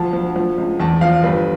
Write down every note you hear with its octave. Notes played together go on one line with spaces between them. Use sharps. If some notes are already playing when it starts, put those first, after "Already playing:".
Already playing: D2 F3 A5
F3
F3
C#2
E2 A5
F3 F5
G1 B4